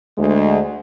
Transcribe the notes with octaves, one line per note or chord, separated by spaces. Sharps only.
D2 G#3